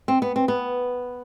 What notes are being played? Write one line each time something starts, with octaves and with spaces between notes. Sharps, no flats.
C4
B3
C4
B3